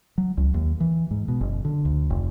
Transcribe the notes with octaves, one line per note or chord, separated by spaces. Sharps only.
F#3
C#2
D#2
E3
G#2
B2
F#1
D3
D2
F1